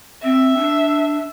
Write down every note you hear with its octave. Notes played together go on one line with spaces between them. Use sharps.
C4 E5
D4